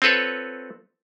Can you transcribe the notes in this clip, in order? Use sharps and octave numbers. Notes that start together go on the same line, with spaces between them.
C4 F4 A4 B4 C#5